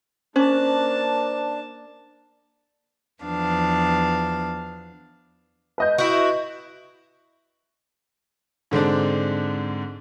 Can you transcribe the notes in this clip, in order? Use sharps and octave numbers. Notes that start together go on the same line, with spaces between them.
A#3 C#4 D4 C5 A5
E2 F3 B3 D4 F5
B4 D#5 G6
E4 F#4
G#2 D3 C4 D4